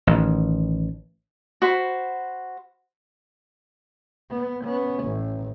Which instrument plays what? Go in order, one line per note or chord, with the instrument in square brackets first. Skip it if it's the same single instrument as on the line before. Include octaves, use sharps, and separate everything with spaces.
[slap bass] A1 D#3
[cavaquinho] F#4 C5 B5
[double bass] B3
B3 C#4
A1